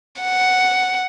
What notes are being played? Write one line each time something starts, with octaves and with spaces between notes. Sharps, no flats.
F#5